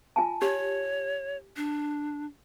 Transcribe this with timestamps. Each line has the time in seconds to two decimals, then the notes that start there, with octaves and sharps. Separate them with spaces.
0.16 F4 G#5 A5
0.42 G4 C#5
1.56 D4